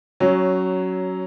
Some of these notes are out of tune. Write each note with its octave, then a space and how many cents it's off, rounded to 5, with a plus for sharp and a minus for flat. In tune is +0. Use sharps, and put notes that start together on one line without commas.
F#3 +10 C#4 +0